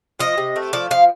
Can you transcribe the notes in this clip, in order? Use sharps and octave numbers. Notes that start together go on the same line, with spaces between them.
F3 D#5
C3
A3
F3 D5
F3 F5